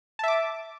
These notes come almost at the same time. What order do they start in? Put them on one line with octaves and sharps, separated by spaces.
A5 E5 D6